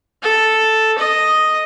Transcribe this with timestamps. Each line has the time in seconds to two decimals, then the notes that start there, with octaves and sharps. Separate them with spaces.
0.23 A4
0.98 D#5